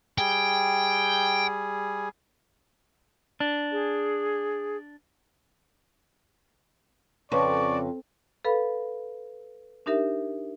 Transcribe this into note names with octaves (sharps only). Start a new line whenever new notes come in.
G3 G#4 G5
D4
G#4
F2 C#3 B4 C#5 D5 C#6
A4 B4 F5 B5
D4 D#4 G4 A#4 E5